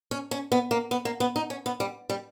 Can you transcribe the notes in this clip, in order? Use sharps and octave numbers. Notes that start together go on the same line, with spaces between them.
C#4
C#4
B3
A#3
B3
A#3
B3
D#4
C#4
B3
G3
G3